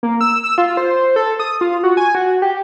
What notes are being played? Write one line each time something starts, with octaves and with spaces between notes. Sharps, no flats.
A#3
E6
E6
F4
C5
A4
D#6
F4
F#4
G#5
F#4
G4